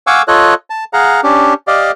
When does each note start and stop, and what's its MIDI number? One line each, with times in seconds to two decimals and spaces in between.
0.07 0.22 77
0.07 0.22 78
0.07 0.22 80
0.07 0.22 85
0.07 0.22 86
0.07 0.22 88
0.28 0.54 65
0.28 0.54 69
0.28 0.54 73
0.28 0.54 75
0.28 0.54 90
0.70 0.84 81
0.93 1.21 68
0.93 1.21 77
0.93 1.21 78
0.93 1.21 82
1.23 1.54 61
1.23 1.54 62
1.23 1.54 67
1.67 1.91 67
1.67 1.91 74
1.67 1.91 75
1.67 1.91 77